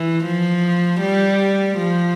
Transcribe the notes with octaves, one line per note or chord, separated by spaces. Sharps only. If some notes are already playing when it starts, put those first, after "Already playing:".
Already playing: E3
F3
G3
F3